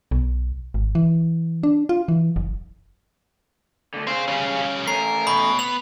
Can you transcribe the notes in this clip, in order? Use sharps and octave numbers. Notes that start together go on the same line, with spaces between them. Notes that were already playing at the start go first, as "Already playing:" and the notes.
B1
G#1
E3
D4
F4
E3
F#1
D3 A3
C4 G#4 F5
G3 C#4
A3 C#4 A#4 C7
B2 B5
B3 F7